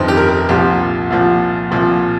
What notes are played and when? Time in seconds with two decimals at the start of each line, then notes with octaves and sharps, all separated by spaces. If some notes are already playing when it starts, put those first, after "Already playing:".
Already playing: G1 F2 D#3 C5
0.08 G4
0.17 A#4
0.49 C2 A#2 F3 G4
1.10 C2 A#2 F3
1.71 C2 A#2 F3